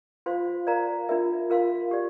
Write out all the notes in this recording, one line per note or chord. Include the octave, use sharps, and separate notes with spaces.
F4 C5 F5 C6
A#4 D5 F5 A#5
D4 F4 A#4 E5
F4 A#4 F5 C6
G4 D5